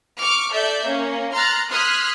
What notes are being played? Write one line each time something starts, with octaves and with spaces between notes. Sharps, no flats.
C#6 D6 F6
A4 D5 E5 G6
A#3 C#4
A#5 C6 F6 F#6 A6
C6 D#6 F6 F#6 G#6 B6